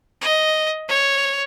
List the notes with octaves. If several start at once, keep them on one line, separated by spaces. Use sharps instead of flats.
D#5
C#5